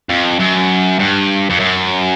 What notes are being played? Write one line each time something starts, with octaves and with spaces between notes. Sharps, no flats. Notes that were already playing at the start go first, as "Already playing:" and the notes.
F2
F#2
G2
F2
F#2